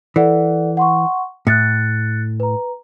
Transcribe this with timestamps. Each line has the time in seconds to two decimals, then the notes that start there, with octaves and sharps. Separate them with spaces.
0.16 E3 A4 D5 F#5
0.77 F#5 C6 C#6
1.47 A2 F#6 A6 C#7
2.40 B4 A#5